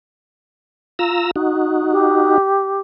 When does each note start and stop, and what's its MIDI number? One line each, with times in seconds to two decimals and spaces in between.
0.99 1.31 65
0.99 1.31 82
0.99 1.31 88
1.36 2.38 63
1.36 2.38 66
1.91 2.81 67